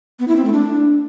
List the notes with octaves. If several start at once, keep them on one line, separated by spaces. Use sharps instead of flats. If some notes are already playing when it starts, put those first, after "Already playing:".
B3
E4
C4
A3
D4